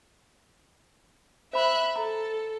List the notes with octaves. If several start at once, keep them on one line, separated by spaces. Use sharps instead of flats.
C5 E5 B5 F#6
A4 A#5